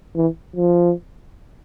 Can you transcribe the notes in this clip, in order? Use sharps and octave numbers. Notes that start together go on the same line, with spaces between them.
E3
F3